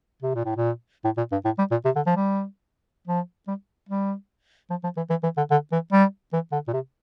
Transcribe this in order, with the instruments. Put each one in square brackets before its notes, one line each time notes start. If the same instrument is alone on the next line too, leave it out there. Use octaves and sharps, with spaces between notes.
[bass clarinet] C3
A#2
A2
A#2
A2
A#2
G2
A2
G3
A#2
C3
D3
F3
G3
F3
G3
G3
F3
F3
E3
E3
E3
D3
D3
E3
G3
E3
D3
A#2
C3